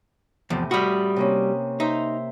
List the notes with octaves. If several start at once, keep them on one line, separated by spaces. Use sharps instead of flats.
E2 A2 C3 F3
G3 F#4 B5 D#6 F6
C3 A#3 C#4
D#4 C5 E5